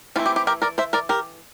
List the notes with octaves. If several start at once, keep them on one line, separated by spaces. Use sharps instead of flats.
E3 A3 C4 E4 F4
G4
G4
G4 A#4
A#4 D5
C5 E5
A#4 D5
G4 A#4